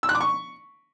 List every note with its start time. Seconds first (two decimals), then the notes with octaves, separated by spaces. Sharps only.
0.03 E6
0.09 F#6
0.15 D6
0.21 C#6